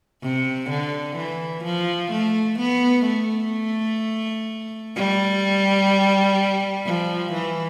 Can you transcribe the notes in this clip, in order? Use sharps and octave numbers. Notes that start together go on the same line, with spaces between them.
C3
D3
E3
F3
A3
B3
A3
G3
F3
E3